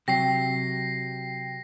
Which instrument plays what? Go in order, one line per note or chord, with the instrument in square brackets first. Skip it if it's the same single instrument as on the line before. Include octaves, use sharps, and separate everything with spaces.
[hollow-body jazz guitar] C3 F#3 [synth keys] G5 [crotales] A#6 C7